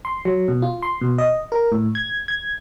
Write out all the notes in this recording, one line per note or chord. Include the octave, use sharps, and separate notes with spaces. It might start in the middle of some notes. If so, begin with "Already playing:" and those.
C6
F#3
B2
F4
C6
B2
D#5
A#4
A2
G#6
G#6